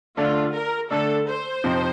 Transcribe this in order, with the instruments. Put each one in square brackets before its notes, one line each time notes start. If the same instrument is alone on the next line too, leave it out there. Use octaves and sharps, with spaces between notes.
[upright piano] D3 A3 D4 [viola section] F4
[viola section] A#4
[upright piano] D3 A3 D4 [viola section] A4
[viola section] C5
[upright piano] F2 C3 F3 C4 D#4